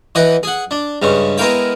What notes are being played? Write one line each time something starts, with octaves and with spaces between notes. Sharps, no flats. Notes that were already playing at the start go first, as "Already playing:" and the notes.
E3 D#5 F#5 G5
G#4 F#5
D4
G2 C#3 G#3
G#3 B3 E4 A#4 F5 G5